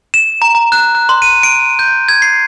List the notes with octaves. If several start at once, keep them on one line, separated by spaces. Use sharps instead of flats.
E7
A#5
A#5
F#6
F#6
C6
D#7
D7
G6
G#6
C7